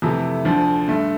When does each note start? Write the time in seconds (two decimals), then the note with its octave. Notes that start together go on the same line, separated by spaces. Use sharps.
0.02 F2 C3 E3 A3 E4
0.45 D2 D3 F3
0.88 G2 D3 A3